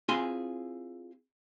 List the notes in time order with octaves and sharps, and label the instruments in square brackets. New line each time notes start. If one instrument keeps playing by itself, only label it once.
[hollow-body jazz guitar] C4 E4 F4 G#4 G#5 C6